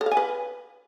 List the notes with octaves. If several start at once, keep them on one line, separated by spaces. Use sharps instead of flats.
A4
F5
G#5
B4